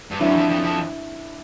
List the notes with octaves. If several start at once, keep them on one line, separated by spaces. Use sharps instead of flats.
G2
F#2 D4 E4
F2
F2
F2